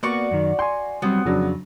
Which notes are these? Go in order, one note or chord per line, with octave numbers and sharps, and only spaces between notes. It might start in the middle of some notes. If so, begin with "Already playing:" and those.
A#3 B3 F#4 D5 C#6
F#2 D#3
G5 G#5 C6
F#3 G3 B3 C4
F2 C#3 F#3 D4